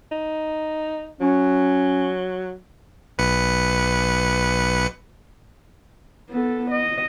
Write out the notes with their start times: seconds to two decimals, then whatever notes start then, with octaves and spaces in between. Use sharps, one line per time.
0.12 D#4
1.21 F#3 C#4
3.18 B1 B4 C#7
6.30 B3 A4
6.71 D#5